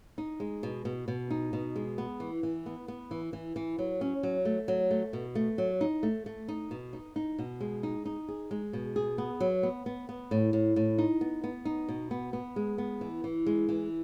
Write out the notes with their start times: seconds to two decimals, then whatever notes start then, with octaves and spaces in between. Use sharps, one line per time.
0.18 D#4
0.40 G#3
0.63 B2
0.85 B2
1.08 B2
1.30 D#4
1.53 B2
1.76 G#3
1.98 B3
2.20 E3
2.43 E3
2.66 B3
2.88 B3
3.11 E3
3.33 E3
3.56 E3
3.78 F#3
4.01 C#4
4.23 F#3
4.45 A3
4.68 F#3
4.91 A3
5.13 B2
5.35 A3
5.58 F#3
5.81 D#4
6.03 A3
6.26 A3
6.48 D#4
6.71 B2
6.93 D#4
7.16 D#4
7.38 B2
7.60 G#3
7.83 D#4
8.05 D#4
8.28 G#4
8.51 G#3
8.73 B2
8.96 G#4
9.18 B3
9.40 F#3
9.63 B3
9.86 B3
10.09 B3
10.31 A2
10.53 A2
10.76 A2
10.98 D#4
11.21 B3
11.44 B3
11.65 D#4
11.88 B2
12.11 B3
12.33 B3
12.56 G#3
12.78 B3
13.01 E3
13.24 E3
13.46 G#3
13.69 E3